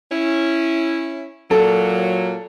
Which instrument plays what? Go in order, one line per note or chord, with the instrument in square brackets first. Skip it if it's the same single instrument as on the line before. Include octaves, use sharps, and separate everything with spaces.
[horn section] C#4 E4
[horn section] A#2 F#3 [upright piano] A4